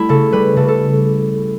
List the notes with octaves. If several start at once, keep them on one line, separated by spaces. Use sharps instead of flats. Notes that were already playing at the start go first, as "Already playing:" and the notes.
Already playing: G3 A3 E4
C#3 A4
G3 B4
C#3 A4
A4